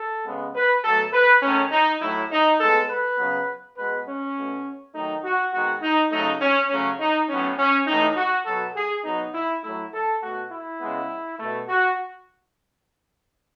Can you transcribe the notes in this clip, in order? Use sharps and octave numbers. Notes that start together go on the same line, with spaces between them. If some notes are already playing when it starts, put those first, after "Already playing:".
Already playing: A4
C#3 G#3 B3
B4
B2 F#3 A3 A4
B4
D#3 A3 C#4
D#4
A2 F#3 A3 E4
D#4
A2 G#3 B3 A4
B4
C#3 F#3 B3
B2 G#3 B3 B4
C#4
B2 A3
D#3 F#3 A3 D#4
F#4
D#3 G#3 B3 F#4
D#4
C#3 F#3 A3 D#4
C#4
C#3 F#3 A3 C#4
D#4
A2 F#3 B3 C#4
C#4
A2 E3 A3 D#4
F#4
B2 F#3 B3 A4
G#4
B2 F#3 B3 D#4
E4
A2 F#3 A3 E4
A4
B2 A3 F#4
E4
C#3 G#3 B3
B2 A3
F#4